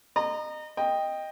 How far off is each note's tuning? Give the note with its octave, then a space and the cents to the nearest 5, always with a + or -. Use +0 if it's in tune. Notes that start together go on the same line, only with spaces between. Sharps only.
D#5 -30 A#5 +0
D#5 +0 G5 +10